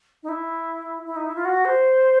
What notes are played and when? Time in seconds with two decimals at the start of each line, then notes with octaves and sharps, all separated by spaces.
0.23 D#4
0.29 E4
1.06 E4
1.16 D#4
1.26 E4
1.36 F4
1.45 F#4
1.65 C5